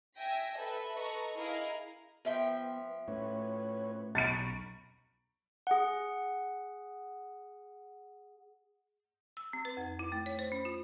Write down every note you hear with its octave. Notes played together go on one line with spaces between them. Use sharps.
E5 G5 G#5 A#6 B6
A4 B4 E5
A4 B4 D#5 A#5 C#6
E4 G#4 A#4 D#5 F5
F3 B3 E5 G5
A2 C#4 B4 C#5
B1 A#5 B5 C#6 A6 C#7 D7
G#4 F#5
E6
C4
B4
F2
E4
A3
C#5
C5
C#4
F4